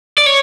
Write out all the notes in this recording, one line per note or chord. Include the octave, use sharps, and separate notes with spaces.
D5
C#5